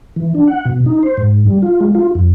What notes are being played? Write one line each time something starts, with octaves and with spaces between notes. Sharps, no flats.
E3
D4
F#5
B2
D#4
C5
G#2
G3
F4
G#3
F4
F2